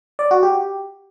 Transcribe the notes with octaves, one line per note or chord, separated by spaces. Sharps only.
D5
F#4
G4